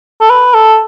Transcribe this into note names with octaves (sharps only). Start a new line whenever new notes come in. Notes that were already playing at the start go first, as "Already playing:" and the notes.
A4
B4
A4